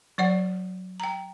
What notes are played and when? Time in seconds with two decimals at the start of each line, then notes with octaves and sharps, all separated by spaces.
0.18 F#3 D5 F#5
1.00 G5 A#5